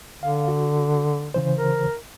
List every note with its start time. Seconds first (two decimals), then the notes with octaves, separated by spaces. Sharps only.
0.23 D3 F5
0.48 F#4
1.34 C#3 E3 C5
1.58 A#4